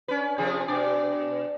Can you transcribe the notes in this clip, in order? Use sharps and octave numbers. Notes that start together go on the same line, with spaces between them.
C#4 B4
C3 F3 G#4
B2 D4 D5